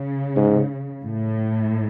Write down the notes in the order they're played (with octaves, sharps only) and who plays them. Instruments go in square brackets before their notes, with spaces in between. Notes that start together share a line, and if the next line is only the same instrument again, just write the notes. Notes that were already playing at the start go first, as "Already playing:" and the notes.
Already playing: [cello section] C#3
[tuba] G#2
[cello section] A2